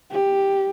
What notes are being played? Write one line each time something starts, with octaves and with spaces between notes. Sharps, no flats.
G4